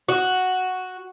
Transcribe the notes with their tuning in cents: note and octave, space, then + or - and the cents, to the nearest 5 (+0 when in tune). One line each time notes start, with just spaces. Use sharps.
F#4 +0